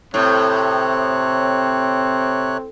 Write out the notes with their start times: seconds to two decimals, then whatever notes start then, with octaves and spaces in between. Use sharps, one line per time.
0.14 A2 C3 C4 C#5 F#6